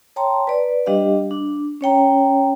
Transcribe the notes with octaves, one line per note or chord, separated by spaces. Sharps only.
C#5 G5 A5 A#5 C6
B4 D5
G3 D4 G4 D#5 F5
D4
C#4 C#5 G5 A#5